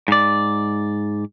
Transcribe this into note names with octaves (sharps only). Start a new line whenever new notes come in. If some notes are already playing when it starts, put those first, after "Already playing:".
G#2 D5